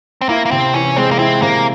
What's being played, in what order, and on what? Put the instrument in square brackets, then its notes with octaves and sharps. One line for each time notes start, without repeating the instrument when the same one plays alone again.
[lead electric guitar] C4
[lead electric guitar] A#3 [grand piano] E4
[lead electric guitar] A#3
[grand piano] C3 [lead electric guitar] C4
[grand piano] E3 [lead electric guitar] C#4
[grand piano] G#3 [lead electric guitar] C4
[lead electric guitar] A#3
[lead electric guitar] C4 [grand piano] E4
[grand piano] C3 [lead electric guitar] A#3